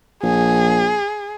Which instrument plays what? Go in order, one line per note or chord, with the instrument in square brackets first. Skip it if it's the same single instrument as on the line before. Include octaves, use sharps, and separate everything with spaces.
[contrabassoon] A#1 [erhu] G#4